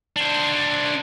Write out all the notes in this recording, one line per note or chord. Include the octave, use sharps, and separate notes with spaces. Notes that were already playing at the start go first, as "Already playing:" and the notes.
D4 C5